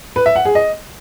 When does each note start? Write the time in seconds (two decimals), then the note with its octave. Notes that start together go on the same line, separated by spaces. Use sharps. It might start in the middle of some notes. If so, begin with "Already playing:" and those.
0.16 B4
0.26 E5
0.36 F#5
0.45 G#4
0.55 D#5